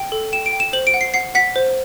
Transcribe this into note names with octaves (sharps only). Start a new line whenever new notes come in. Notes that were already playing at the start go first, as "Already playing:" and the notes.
Already playing: G5
A4
G5 E7
D7
G5
E7
C5 F#7
D7
F#5
C7
F#5 C7
F#5 B6
C5